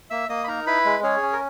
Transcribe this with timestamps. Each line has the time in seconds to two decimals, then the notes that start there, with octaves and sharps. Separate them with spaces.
0.10 A#3 E5 E6
0.29 A#3 D#5 D#6
0.44 B5
0.48 D#4 A#4 A#5
0.67 E4 B4 B5
0.85 G#3
1.03 C#4 G#4 C#5
1.22 C#4
1.33 A#4